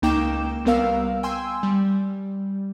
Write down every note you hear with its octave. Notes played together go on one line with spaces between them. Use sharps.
C#2 A#3 D#4 G5 D6 E7
C2 G3 B3 A#4 F5 E6
G5 G#5 C6 E6
G3